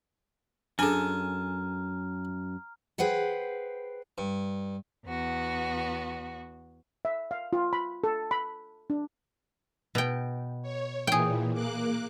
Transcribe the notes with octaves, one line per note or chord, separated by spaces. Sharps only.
F#2 D4 G#4 A4 G#5 A#5 F6
G#4 B4 C5 F#5 G5
G2
E2 B3 F#4
E5
F5
F4
B5
A4
B5
D4
B2 G5
C#5
A#2 E3 G#4 G5
A#3 D6 F#6